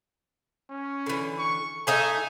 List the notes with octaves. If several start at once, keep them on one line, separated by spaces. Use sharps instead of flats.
C#4
D3 E3
C#6
A3 D#4 E5 G#5